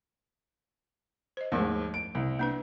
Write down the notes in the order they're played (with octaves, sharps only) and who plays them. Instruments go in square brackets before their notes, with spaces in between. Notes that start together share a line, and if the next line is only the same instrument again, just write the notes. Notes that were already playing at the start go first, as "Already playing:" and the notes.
[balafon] C5 D#5
[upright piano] D#2 G#2 [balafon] F3 A3
[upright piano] D7
C2
[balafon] A#3 D4 B4